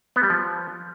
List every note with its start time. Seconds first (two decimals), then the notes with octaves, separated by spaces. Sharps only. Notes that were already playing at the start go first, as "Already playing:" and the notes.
0.16 B3
0.23 G3
0.30 F3